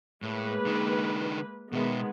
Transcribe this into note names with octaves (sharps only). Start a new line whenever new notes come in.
A2 G#3 A#3 B4
D3 D#4
B2 D#3 G#3 B3 E5